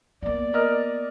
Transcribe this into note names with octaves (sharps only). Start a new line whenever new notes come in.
A#3 B3 D5
A#4 D#5 F6